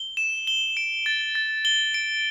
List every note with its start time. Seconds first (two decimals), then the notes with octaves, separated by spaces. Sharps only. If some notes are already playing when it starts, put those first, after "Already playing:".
Already playing: G7
0.17 E7
0.47 G7
0.77 D7
1.06 A6
1.35 A6
1.65 G7
1.94 D7